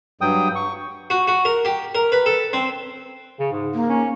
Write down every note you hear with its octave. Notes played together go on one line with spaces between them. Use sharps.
G2 F#3 G5 D#6
C#6
F#4
F#4
A#4
G4
A#4
B4
A4
C4
C#3
G#2
A#3
C#4